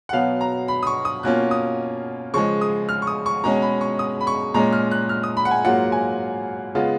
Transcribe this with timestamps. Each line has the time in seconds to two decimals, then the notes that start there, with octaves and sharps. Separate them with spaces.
0.09 F#5
0.13 B2 F#3 B3 F5
0.41 A#5
0.68 B5
0.83 D#6
0.87 C#6
1.05 D#6
1.23 B2 A#3 C#4 F4 F#6
1.51 D#6
2.34 C#3 F3 G#3 C#6
2.61 D#6
2.89 F6
3.02 C#6
3.07 D#6
3.26 C#6
3.44 B2 G#3 C#4 A#5
3.62 B5
3.81 C#6
3.99 D#6
4.21 B5
4.27 C#6
4.54 A#2 G#3 C#4 A#5
4.73 F6
4.91 F#6
5.09 F6
5.23 D#6
5.37 B5
5.45 F#5
5.51 G#5
5.65 G#2 F#3 A#3 F4 F#5
5.92 G#5
6.75 C#3 G#3 B3 F4